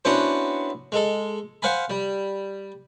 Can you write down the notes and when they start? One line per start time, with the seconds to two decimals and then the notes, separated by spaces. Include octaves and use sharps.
0.05 B3 C#4 D4 E4 F#4 C5
0.92 G#3 A4
1.62 C5 F5 F#5 G#5 B5
1.90 G3